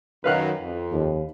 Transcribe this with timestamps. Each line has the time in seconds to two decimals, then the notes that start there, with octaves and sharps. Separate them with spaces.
0.24 F#2 D#3 B4 F5 F#6
0.61 F2
0.91 D#2